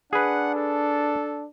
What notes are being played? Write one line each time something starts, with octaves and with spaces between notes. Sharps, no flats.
D4 G#4 B4 F#5
A4